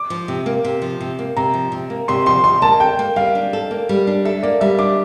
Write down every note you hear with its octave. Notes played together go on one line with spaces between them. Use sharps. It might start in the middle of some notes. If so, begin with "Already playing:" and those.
Already playing: D6
F3
C3
A#3
C3
F3
C3
A#3
C3 A#5
F3
C3
A#3
C3 C6
F3 C6
C3 C6
A#3 A5
A4 G5
A#3
G3 F5
D4
A4
A#3
G3
D4
A4 E5
A#3 D5
G3 E5
D4 D6